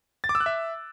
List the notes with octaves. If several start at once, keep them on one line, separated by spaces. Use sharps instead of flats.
A6
D6
E6
F#6
E5